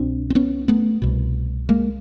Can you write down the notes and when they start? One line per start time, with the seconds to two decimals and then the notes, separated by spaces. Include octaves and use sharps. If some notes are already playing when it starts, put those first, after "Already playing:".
Already playing: C2 B2 C4 D4
0.30 C4
0.35 B3 C#4
0.68 A3 B3
1.02 C2 B2
1.69 G#3 A#3